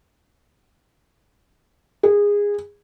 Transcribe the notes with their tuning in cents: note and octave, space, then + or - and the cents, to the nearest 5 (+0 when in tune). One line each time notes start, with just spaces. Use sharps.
G#4 -20